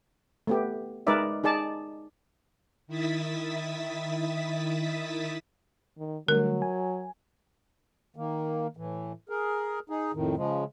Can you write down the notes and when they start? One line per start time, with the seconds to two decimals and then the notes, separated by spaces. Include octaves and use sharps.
0.47 A3 B3 G4
1.07 G#3 D#4 A#4 B4 D5 E5
1.44 D#4 G#4 D5 A5
2.87 D#3 E4 E5 D#6 A6 B6
5.98 D#3
6.28 D3 F#3 G3 A3 A#4
6.62 G#5
8.16 D#3 A#3
8.77 A2 E3
9.29 G#4 A#4
9.90 D#4 G#4
10.14 F2 A2 D#3
10.37 C#3 F3 G#3